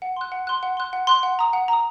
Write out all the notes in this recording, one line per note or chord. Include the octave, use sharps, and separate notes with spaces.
F#5
C6 F#6
F#5
C6 F#6
F#5
C6 F#6
F#5
C6 F#6
F#5
A#5 D#6
F#5
A#5 D#6